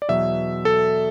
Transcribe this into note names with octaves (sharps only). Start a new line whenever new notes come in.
D5
E2 B2 F#3 E5
A4